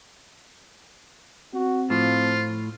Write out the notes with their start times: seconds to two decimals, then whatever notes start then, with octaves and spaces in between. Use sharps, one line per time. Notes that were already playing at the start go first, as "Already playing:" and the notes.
1.54 C4 F#4
1.90 A2 F3 F4